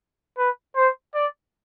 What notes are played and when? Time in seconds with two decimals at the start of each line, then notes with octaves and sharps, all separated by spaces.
0.38 B4
0.76 C5
1.14 D5